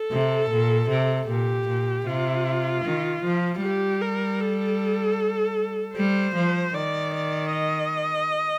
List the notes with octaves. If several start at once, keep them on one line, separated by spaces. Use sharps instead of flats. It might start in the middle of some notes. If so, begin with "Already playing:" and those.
Already playing: A4
C3
A#2
C3
A#2 G4
A#2
C3 F4
D#3
F3
G3 G4
A#4
A4
G3 C5
F3
D#3 D5
D5
D#5